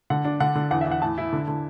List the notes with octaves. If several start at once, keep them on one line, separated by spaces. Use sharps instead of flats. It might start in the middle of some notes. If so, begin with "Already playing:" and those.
D3 F#5
D4
D3 F#5
D3
E2 F#5
E5
E2 F#5
A2 A5
E4
D3
D3